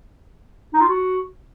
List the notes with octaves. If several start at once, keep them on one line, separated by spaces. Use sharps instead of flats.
D#4
F4
F#4